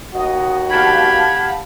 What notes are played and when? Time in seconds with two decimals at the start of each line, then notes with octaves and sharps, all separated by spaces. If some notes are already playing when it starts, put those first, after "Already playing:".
0.14 D#2 F#4 D#5
0.70 G4 F5 F#5 A5 B5 G#6